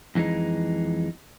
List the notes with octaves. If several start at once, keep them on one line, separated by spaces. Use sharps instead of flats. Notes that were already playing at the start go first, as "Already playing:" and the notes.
F2 E3 G#3 C4 D#4